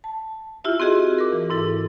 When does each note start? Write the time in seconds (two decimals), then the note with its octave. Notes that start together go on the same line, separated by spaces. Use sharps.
0.04 A5
0.64 E4 F4 G4 E5
0.80 C4 F#4 G#4 D#5
1.18 A#4 D6
1.32 E3
1.50 G#2 E4 A4